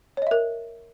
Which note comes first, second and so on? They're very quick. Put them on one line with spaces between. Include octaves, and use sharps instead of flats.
C#5 D#5 E5 A#4